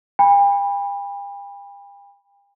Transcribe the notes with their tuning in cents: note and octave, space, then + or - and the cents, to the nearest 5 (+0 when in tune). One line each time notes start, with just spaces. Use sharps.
G5 +45 B5 -10